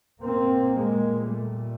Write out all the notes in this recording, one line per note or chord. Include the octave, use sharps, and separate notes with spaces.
A#2 A#3 C4
G#3 A#3
G3 A3